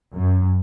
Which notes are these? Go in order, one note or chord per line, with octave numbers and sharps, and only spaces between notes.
F#2